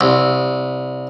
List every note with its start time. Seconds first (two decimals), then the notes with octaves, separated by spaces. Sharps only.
0.01 C2